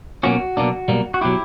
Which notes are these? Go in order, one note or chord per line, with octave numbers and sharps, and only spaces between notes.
B2 F#3 A#3 C#4 F#4
B1 B2 A#3 D4
B1 B2 G3 A#3
F#4
B2 F#3 E4 G4